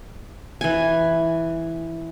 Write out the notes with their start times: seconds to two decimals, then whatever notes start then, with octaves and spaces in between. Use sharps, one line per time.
0.61 E3 G#5